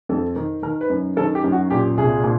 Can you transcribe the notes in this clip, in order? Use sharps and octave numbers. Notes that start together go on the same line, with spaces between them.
F2 A4
D#3
D#3 A#4
B4
F#2
D#3 A4
G4
F#2
F#4
A#2 G4
C2 G#4
A#2